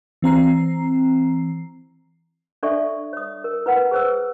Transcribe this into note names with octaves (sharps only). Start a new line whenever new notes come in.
E3 C4 A#5 C7
D4 A4 D5 E5 C#6
C#5 D#6
A#4
E4 B4 F#5 G5
G#4 B4 C5 G5 E6